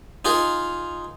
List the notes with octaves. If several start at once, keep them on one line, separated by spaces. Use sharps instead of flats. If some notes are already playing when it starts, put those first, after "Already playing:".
D#4 F4 G#4 A#4